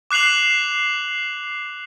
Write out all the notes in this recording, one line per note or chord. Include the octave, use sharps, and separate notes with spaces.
D6 F#6 C7 F7 F#7